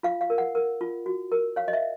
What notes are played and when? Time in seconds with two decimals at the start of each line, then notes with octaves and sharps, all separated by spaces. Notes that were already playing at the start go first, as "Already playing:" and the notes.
0.03 F4 F5
0.21 F5
0.30 A#4
0.38 F#5
0.55 A#4
0.81 F4
1.06 F#4
1.32 A#4
1.56 C#5 F5
1.68 D#5
1.73 E5